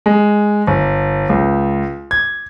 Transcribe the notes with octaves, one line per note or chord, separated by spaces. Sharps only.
G#3
G1
C#2
G#6